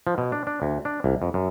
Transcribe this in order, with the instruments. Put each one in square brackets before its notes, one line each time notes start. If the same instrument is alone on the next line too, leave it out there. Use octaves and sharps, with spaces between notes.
[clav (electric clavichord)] F3
B2
D4
D4
D2
D4
C2
F2
F#2